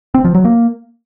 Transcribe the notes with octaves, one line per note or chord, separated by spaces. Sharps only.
C4
F3
F#3
A#3